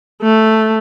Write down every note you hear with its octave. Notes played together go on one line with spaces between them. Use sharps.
A3